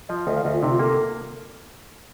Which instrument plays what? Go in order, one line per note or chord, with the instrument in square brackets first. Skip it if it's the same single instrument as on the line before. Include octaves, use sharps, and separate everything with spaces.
[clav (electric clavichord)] F3 [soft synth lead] D#5
[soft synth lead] F5
[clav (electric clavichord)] D2 [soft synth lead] D#5
[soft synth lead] F5
[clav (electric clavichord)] D2 [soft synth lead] D#5
[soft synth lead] F4
[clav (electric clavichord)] C3 [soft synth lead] D#4
[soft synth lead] F4
[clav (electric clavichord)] A#3 [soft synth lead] A4